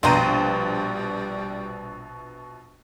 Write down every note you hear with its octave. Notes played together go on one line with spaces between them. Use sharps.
A#1 B2 G3 C5 G5 A#5 D#7